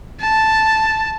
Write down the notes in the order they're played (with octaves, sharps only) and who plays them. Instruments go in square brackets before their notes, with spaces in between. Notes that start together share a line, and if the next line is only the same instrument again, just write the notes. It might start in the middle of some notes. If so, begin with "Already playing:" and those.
[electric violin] A5